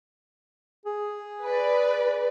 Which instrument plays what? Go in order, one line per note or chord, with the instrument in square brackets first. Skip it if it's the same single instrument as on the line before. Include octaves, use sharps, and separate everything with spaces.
[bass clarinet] G#4
[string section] B4 D5